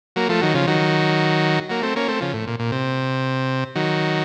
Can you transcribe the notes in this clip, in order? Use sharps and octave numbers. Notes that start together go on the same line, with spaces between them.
F#3 A#3
F3 A3
D#3 F#3
C#3 F3
D#3 F#3
F#3 A#3
A3 C4
A#3 C#4
A3 C4
C#3 F3
A2
A#2
A#2
C3
D#3 F#3